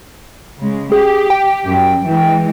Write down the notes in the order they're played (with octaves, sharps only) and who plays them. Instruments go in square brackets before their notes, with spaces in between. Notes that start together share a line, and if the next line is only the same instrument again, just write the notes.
[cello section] C#3 G#3
[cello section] G4 [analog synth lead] G#4
[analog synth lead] G5
[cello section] F#2
E3 G#3